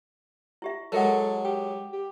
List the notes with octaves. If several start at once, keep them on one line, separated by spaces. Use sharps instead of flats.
E4 G4 E5
F#3 G#3 A4 A#4 E5 F#5
G4 G5
G4